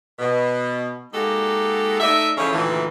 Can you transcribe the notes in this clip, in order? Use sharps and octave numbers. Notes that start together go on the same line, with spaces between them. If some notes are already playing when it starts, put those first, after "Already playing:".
B2
G#3 A#3 D#4 F#4 G4 A4
A3 D#4 D5 E5
C#3 F3 E4 A4 C#5
D2 A#2 D#3 E3